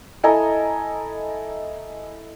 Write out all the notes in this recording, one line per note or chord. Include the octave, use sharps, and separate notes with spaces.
E4 A4 D#5 G#5 A#5